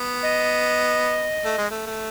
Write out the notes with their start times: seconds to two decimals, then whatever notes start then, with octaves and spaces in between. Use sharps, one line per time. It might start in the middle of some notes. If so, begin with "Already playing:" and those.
Already playing: B3
0.23 D#5
1.45 A3
1.58 G#3
1.71 A3
1.86 A3